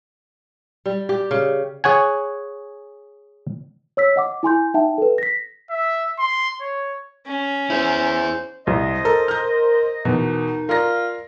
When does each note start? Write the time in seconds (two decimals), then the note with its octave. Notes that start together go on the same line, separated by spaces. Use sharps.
0.86 G3
1.09 G4
1.31 C#3
1.84 G#4 C#5 F#5 G#5
3.97 C#5 E6 B6
4.16 D#5 F#5 D6
4.43 E4 G#5 C6 G6
4.74 D#4 E5 F#5 G5 A5
4.98 A4 B4
5.18 A#6 B6
5.70 E5
6.19 C6
6.61 C#5
7.26 C#4
7.70 E4 G#4 C5
8.67 C2 C5 D#5
9.05 A4 A#4
9.28 F6 G6
10.05 E2 B2 D#4
10.69 F4 A#4 D5 A#6